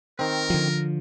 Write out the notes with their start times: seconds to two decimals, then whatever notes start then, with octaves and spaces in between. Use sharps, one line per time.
0.19 D#3 C4 A#4
0.50 D3 F3